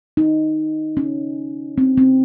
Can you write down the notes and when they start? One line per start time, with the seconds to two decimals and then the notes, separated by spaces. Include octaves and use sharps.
0.17 D#4
0.97 C#4
1.78 C4
1.97 C4